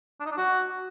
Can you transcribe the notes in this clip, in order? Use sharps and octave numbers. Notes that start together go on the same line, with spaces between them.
D4
D#4
D4
F#4